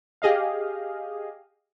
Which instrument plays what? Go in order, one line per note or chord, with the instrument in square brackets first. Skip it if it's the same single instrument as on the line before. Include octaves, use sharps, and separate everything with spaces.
[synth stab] G4 G#4 D#5 F5